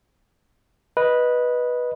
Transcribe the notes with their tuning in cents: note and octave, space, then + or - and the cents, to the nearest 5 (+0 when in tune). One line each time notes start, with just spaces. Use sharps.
B4 -10 D#5 +0